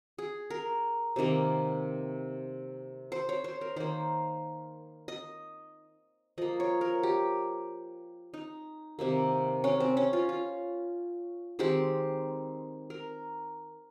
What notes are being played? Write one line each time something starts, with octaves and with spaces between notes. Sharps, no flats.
G#4
A#4
C3 D#3 A#3
C5
C#5
C5
A#4
D#3 A#3 C5
D#5
F3 A#3 D#5
C#5
A#4
G4
D#4
C3 D#3 A#3
C#4
C4
C#4
F4
F4
D#3 G#3 C4 G4
A#4